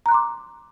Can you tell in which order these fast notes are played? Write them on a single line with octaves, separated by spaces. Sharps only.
A#5 F#6 C6 D6